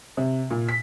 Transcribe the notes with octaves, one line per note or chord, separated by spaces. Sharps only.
C3
A#2
B6